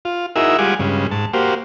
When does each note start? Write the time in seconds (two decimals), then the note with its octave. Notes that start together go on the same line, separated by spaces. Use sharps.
0.05 F4
0.36 D#4 E4 F#4 G#4 A#4 E5
0.59 G3 G#3 F4 F#5 G#5 D6
0.79 G2 C#3 G#3
1.11 G#2 A5
1.33 A#3 F#4 G4 C5 F5